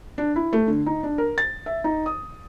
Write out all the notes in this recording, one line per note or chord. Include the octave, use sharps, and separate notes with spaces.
D4
E4
A3
D3
D#4
D4
A#4
A6
E5
D#4
D#6